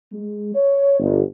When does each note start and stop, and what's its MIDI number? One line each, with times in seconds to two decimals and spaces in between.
0.13 0.51 56
0.55 0.98 73
1.00 1.20 31